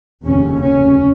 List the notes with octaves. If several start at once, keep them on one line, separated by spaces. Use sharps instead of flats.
F1 D#2 C#3 C#4
C#4